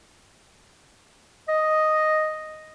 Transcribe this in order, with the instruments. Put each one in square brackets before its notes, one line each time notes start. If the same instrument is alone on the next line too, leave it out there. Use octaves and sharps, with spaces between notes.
[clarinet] D#5